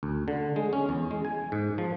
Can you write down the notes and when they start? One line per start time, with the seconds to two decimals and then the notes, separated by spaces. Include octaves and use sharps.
0.03 D2
0.28 D3
0.56 G#3
0.73 C#4
0.89 E2
1.11 G#3
1.25 G#5
1.52 G#2
1.78 F3